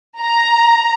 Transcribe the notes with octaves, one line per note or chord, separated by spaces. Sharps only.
A#5